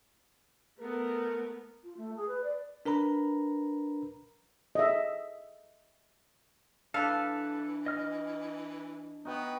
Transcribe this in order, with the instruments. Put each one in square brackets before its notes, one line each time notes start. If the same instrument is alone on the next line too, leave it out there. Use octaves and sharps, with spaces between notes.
[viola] A3 B3 [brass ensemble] A#4
[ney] F4
A3
G#4
B4
D5
[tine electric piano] D4 A#4 B4 A#5 B5
[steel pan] D#5 E5
[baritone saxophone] E3 [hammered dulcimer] D4 [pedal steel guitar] A4 B4 [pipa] F5
[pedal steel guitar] D#5 F6
[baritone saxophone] B3 [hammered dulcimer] D#4 F#4 G5